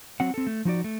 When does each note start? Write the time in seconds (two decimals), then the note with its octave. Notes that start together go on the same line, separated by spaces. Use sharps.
0.20 F#3 C4 F#5
0.34 C4 A4
0.47 A3
0.65 F3 D#4 F#4 D5
0.84 A3